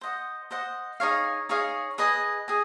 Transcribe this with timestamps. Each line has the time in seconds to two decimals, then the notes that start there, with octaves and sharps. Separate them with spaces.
0.01 C5 D#5 F#5
0.51 C5 D#5 F#5
1.00 D#4 G#4 C#5 F5
1.49 D#4 G#4 C#5 F5
1.98 G#4 B4 D#5 G#5
2.48 G#4 D#5 G#5